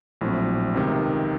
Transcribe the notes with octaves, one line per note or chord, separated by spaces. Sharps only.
A#1 A2 F#3 C4
C#2 C3 D#3